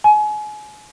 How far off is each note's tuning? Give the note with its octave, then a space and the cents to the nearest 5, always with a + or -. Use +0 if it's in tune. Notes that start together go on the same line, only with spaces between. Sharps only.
G#5 +30